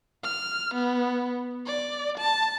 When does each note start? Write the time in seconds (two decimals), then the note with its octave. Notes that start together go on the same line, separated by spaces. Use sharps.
0.24 F6
0.75 B3
1.67 D5
2.18 A5